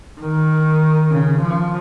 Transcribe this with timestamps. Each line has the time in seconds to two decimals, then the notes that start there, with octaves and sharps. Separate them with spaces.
0.20 D#3
1.11 C#3
1.41 F3